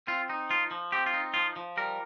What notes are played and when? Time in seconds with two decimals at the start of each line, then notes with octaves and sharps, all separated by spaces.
0.07 C4 F4
0.29 D#4
0.50 F3 F4
0.71 F3
0.92 C4 G4
1.06 F4
1.14 D#4
1.34 F3 F4
1.56 F3
1.77 G3 A#4